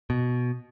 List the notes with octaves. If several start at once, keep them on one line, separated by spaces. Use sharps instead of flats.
B2